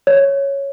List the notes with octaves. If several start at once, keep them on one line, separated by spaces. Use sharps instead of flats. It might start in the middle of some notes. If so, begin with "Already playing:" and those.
C#5